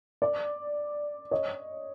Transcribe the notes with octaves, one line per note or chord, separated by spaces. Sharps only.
D5
C#5 D#5